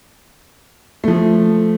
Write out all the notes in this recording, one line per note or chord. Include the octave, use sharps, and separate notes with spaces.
F3 A3